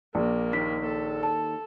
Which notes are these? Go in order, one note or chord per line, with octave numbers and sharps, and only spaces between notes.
A#1 A#3
D#2 B6
A4
A5